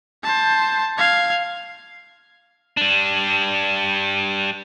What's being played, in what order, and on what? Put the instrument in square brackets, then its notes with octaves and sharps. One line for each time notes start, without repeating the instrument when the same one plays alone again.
[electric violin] C5 A5
F5 G#6
[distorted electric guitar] G3 D4